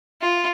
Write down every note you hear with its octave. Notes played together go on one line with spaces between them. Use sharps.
F4